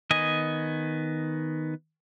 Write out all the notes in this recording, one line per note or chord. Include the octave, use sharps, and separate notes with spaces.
D#3 B3 D#5 G#5